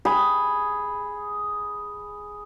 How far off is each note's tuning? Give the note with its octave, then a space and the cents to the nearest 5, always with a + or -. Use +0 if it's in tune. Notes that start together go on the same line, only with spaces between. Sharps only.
G#4 +0 B5 +0